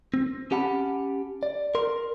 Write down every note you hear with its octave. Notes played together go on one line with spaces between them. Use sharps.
C4
C#4 G4 F#5 A5 B5
D5
A#4 C6